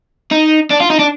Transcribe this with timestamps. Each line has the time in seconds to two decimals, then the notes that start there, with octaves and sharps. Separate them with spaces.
0.32 D#4
0.71 D4
0.80 F4
0.90 D#4
0.99 D4